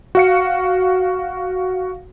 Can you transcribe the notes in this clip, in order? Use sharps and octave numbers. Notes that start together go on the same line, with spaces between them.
F#4 F5 C#7